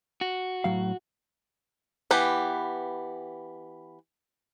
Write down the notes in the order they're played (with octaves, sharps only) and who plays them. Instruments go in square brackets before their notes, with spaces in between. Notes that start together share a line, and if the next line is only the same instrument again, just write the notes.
[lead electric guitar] F#4
[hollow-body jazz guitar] A2 F#3 F5
[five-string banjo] E3 B3 G4